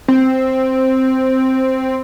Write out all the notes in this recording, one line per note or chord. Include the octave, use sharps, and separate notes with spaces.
C4